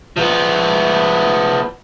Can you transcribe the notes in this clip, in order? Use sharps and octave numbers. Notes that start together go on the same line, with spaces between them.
F3 B3